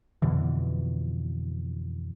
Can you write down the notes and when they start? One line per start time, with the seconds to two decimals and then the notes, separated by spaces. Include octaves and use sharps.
0.22 F2 B2 D3 E3